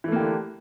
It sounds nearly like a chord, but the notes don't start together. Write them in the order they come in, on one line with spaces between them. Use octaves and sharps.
E3 A3 A#3 G4 D3